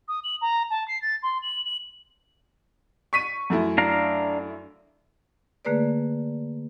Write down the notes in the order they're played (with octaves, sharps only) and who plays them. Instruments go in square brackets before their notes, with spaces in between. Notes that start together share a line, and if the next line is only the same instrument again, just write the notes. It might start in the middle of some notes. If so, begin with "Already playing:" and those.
[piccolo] D#6
F#7
A#5
A5
C7
A6
C6
F#7
F#7
[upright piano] C#6 B6 D#7
F#2 A3 E4
[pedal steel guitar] D4 F5 A#5
[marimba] D3 A3 A#3 G#4 B4 D5